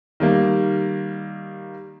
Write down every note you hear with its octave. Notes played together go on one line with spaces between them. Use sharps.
D#3 G3 A#3